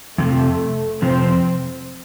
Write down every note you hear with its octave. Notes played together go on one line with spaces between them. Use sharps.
F2 C3 F3 A3
F2 C3 F3 C4